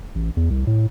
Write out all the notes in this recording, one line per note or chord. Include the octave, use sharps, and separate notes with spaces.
A1
E2
C2
A2